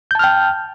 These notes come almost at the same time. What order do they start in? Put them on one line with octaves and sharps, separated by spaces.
G6 A5 F6 G5